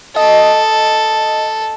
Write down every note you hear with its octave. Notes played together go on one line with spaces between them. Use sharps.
A4 D#5